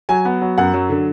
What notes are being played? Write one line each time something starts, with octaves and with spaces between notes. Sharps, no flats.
F#3 G#5
B3
F#3
F#2 F#5
F#3
D3